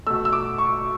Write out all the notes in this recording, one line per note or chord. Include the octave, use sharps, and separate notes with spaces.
B2 A3 E6
E6
D6
C#6